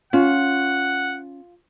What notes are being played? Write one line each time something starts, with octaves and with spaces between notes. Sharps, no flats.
C#4 F4 F#5